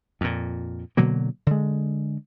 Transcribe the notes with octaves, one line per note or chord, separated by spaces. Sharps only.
F2 A#2
B2 D3 F#3 A#3
D3 G#3